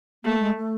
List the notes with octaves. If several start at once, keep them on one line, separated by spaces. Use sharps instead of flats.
A3 A#3
G#3
A3